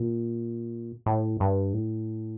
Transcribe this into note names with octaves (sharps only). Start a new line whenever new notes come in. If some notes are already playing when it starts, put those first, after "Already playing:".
Already playing: A#2
A2
G2
A2